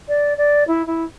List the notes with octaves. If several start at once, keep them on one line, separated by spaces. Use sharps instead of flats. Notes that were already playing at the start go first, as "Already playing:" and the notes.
D5
D5
E4
E4